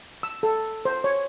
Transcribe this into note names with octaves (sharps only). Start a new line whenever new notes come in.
E6
A4
C5
C#5